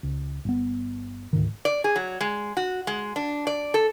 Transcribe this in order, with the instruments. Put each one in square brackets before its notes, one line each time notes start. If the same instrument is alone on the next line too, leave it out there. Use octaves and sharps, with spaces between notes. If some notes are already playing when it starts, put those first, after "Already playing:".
[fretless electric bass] C#2
G1 B3
D2 G#2 D#3
[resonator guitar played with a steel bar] D5
G#4
F#3
G#3
F#4
G#3
D4
D5
A4